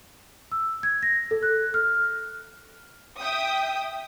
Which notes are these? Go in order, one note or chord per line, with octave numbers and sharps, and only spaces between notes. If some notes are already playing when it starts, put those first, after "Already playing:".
E6
G#6
A#6
A4
F#6
F6
E5 G5 D#6